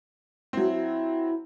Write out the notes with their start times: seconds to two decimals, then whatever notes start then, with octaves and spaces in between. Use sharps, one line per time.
0.53 F#3 C4 E4